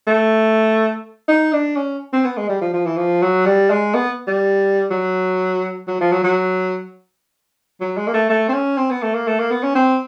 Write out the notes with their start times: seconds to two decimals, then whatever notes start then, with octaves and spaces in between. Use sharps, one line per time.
0.07 A3
1.28 D#4
1.53 D4
1.76 C#4
2.13 C4
2.25 B3
2.37 G#3
2.49 G3
2.61 F3
2.73 F3
2.86 E3
2.97 F3
3.22 F#3
3.46 G3
3.70 G#3
3.94 B3
4.27 G3
4.91 F#3
5.88 F#3
6.00 F3
6.12 F#3
6.24 F#3
7.81 F#3
7.97 G#3
8.07 A#3
8.14 A3
8.30 A3
8.49 C4
8.53 C#4
8.78 C4
8.90 B3
9.03 A3
9.14 A#3
9.27 A3
9.39 A#3
9.51 B3
9.63 C#4
9.75 C4